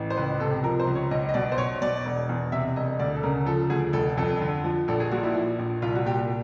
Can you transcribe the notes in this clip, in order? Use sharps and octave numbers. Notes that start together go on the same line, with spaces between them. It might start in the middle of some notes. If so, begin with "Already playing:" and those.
Already playing: A1 E3
C5
C#2 B4
C3 A4
F3 A#4
C5
C#2
C#5
B1 D#5
D#5
B2 D5
C5
B1 C#5
B2 D5
E1
E2
C3 E5
E1 D#5
D2 D5
A4
C#3 A#4
F3 A4
D2 G#4
F1 A4
F2 A4
D3
F3
A#1 A4
G#4
A#2 F#4
E4
F3
A#1
C2 F4
F#4
A#2 G4